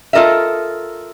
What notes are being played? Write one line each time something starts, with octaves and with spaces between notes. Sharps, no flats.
F4 A4 A#4 D#5 E5